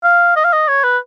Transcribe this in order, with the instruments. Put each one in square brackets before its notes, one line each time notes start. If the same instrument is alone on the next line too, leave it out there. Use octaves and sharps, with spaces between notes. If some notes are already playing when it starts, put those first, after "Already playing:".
[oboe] F5
D#5
F5
D#5
C#5
B4